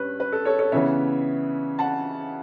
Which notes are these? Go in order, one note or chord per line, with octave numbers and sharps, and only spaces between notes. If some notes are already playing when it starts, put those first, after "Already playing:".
Already playing: G2 C#4 B4
B4
A4
A4 C#5
A4 C#5
C#3 E3 B3 C#5 E5
F#5 A5